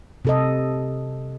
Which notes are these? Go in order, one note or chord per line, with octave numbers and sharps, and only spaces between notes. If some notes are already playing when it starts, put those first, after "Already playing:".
C3 A4 D#5